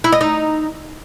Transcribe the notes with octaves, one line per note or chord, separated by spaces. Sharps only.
E4
D#5
D#4